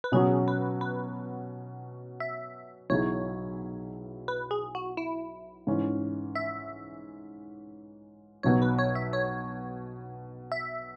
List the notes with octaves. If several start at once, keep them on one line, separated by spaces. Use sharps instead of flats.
B4
B2 F#3 C#4 F#4 G#4
B4
B4
E5
B1 B2 F#3 E4 G#4 C#5
B4
G#4
F#4
E4
G#2 E3 C#4
E5
B1 B2 F#3 B3 C#5
B4
C#5
E5
C#5
E5